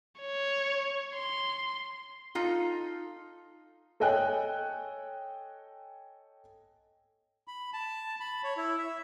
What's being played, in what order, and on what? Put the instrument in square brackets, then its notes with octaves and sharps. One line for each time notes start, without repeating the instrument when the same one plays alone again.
[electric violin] C#5
C6
[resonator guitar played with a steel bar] D#4 F4 A4
[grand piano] A4 C#5 D#5 G5 G#5 F#6
[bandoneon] B5
A5
B5
C#5
E4
E5